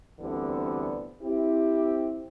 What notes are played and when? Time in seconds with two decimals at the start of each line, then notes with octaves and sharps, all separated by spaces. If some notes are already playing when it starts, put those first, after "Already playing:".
0.20 D2 D3 E3 G3 B3 C4
1.21 C4 E4 G4